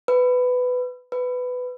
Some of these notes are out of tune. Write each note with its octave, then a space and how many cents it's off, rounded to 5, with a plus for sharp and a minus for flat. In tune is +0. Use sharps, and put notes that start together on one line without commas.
B4 +15
B4 +15